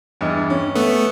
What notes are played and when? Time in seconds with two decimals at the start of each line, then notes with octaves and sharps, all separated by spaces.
0.21 E2 G2 D#5
0.50 C#4
0.75 A3 B3